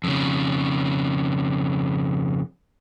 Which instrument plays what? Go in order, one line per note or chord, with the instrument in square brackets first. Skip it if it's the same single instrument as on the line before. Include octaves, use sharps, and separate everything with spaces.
[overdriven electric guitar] F2 C#3